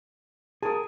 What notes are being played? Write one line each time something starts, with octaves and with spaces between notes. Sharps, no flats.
G#4 A#4 A5 D#6